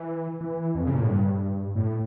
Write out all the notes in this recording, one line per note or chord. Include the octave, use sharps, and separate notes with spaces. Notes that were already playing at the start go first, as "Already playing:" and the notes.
Already playing: E3
E3
F2
C#3
A#2
A2
G2
A2